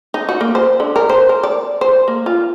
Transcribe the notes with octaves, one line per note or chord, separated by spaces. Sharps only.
D#4
F#4
A#3
C5
D3
A#4
C5
A#4
D5
C5
A#3
F4